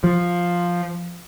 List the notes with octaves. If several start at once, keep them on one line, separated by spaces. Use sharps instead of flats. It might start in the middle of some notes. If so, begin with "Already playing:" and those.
F3